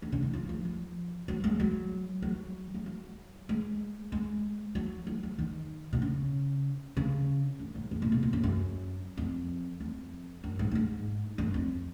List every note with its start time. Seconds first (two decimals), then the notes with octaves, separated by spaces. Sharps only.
0.02 D#3
0.12 C#3
0.22 D#3
0.33 F3
0.49 F3
0.65 F3
1.28 F#3
1.44 G#3
1.60 F#3
2.22 F#3
2.74 G#3
2.86 F#3
3.49 G#3
4.12 G#3
4.75 F#3
5.07 F3
5.23 F#3
5.39 D#3
5.93 B2
6.02 C#3
6.97 C#3
7.60 F#2
7.75 G#2
7.91 F#2
8.02 A#2
8.12 B2
8.23 A#2
8.33 F#2
8.44 F#2
9.18 F2
9.80 F2
10.44 F#2
10.59 G#2
10.71 A#2
10.75 G#2
11.38 F#2
11.54 F2